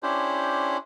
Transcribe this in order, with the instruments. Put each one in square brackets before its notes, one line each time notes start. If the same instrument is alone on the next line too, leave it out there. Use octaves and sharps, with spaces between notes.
[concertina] C#4 D4 E4 G4 C5